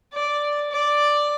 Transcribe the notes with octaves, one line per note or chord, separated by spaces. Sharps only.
D5
D5